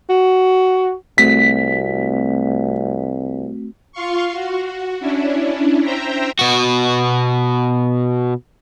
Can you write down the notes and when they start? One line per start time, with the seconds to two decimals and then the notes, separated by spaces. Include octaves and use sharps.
0.10 F#4
1.18 C2 A3 C4 F#4 B6
3.92 F4 F5 C6 C#6
4.32 F#4
5.00 C#4 D4 E4
5.83 C5 E5 G5 A#5
6.39 B2 F#4